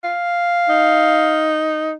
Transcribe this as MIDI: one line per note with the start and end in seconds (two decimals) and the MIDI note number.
0.04 1.57 77
0.69 1.93 63